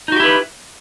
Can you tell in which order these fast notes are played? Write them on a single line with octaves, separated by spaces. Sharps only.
D#4 F#4 G4 E4 B4